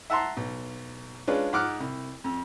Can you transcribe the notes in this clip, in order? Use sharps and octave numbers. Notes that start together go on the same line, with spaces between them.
E5 F#5 A5 A#5 C6
B1
G#3 C#4 D4 F4 B4
G#2 F#5 D6 F6 F#6
C2
F2